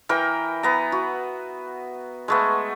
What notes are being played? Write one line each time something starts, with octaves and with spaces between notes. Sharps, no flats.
E3 A#4 G5
B3 A#5
F#4
G#3 A3 B3